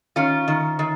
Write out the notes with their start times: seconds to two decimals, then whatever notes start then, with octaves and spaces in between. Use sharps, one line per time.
0.16 D#3 C#4 F4
0.48 D#3
0.79 D#3